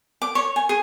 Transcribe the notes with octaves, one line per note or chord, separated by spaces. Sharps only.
D6
C#5
G#5
G#4